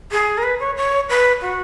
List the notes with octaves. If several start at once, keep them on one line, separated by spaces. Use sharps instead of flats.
G#4
A#4
B4
C#5
C#5
B4
F#4